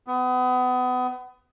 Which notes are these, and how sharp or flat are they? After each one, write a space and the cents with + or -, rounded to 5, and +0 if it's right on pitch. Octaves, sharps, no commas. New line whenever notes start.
B3 +30